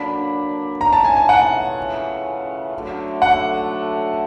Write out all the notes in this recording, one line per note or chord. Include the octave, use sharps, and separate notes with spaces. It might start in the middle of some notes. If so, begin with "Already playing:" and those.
Already playing: D3 F#3 A#3 D4 B5
C#3 E3 A3 C#4 F4 A#5
A5
G#5
G#5
F#5
D3 F#3 A3
F#5